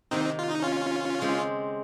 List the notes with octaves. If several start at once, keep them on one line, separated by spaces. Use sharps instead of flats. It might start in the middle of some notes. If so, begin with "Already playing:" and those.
C3 D#3 A#3 C4 D#4
F4
D#4
C#4 F4
C#3 G#3 C4 G4